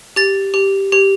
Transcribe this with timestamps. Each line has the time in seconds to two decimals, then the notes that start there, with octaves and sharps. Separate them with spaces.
0.16 G4 A6
0.54 G4
0.92 G4